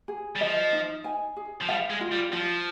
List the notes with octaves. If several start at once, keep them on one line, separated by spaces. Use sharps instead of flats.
G#4
G3
F3 D#5
D#4
G#5
G#4
F3
G3 F5
G#3
F4
G3
F3 F4